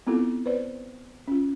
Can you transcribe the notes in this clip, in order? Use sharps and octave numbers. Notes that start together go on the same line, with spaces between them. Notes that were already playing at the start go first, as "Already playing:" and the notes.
B3 C4 E4 F4 A4
B4 C5 D5
C#4 F4